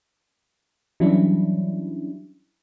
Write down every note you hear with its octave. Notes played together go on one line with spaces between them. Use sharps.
E3 F#3 G3 C#4 D4 E4